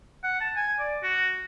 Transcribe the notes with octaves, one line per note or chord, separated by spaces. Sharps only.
F#5
A5
G#5
D5
F#4